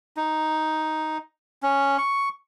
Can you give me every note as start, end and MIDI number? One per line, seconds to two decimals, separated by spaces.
0.17 1.18 63
1.63 1.97 61
1.98 2.29 85